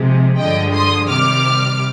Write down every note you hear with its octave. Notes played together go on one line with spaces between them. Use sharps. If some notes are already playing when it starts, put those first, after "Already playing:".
Already playing: C3 F3 G#3
G2 D3 F3 G#3 D#5 G5
C6 D#6
C3 D#3 G3 D6 F6